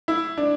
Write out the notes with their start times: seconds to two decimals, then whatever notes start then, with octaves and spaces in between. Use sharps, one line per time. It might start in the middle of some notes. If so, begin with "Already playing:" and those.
0.08 E4
0.37 D4